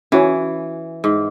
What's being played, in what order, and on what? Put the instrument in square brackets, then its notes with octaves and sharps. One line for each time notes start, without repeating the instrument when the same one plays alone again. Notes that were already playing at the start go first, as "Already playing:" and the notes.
[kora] E3 [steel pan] C#4 F#4 C#5 G#5
[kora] G#2